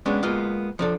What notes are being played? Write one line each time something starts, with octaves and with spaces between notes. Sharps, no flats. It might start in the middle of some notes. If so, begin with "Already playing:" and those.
G#3 B3 C#4 D4
G#3 A#3 B3 F4
F3 D4 A4